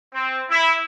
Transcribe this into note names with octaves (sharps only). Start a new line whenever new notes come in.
C4
E4